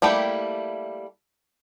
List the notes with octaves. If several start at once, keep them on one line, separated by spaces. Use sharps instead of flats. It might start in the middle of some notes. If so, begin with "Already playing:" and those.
G3 A3 A#3 E4 G4